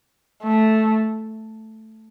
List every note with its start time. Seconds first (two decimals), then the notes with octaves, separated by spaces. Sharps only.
0.43 A3